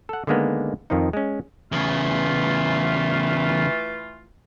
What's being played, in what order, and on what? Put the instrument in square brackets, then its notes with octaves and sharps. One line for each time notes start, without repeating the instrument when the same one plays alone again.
[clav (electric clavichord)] A4 F#5
D3 D#3 G#3 A#3 B3
F2 D#3 F3 D#4
G#3 C#4
[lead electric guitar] E2 C#3 [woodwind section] E3 A3 F4